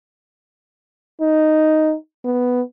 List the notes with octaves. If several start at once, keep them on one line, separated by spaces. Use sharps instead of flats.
D#4
B3